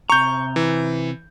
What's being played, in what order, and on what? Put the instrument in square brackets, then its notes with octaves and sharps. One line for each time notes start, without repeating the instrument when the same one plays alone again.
[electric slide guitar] C3 A#5 [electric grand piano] C#6 G6
[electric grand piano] E3